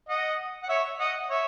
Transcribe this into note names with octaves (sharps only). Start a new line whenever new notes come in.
D#5 F#5
F#5
C#5 E5
D#5 F#5
C#5 E5